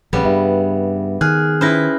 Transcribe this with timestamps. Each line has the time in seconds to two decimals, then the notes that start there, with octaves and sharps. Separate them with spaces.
0.13 A#1 C#3 G3 B3 C#4
0.25 G2 E5
1.21 D#3 G#4 F6 F#6
1.61 C#4 E4 B4 C5 F6 A#6